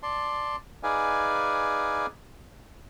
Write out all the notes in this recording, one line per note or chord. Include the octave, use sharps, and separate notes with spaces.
D5 A5 C6
D#4 G#4 B4 D5 F5 G#5